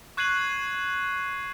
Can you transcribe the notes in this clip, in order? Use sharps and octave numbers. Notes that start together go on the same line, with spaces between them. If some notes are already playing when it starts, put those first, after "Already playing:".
C#6 F#6 G#6 C7 D#7 F#7